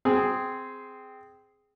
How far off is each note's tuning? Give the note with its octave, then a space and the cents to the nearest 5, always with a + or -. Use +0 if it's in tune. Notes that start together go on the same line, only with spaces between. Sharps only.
C4 -10 G#4 +0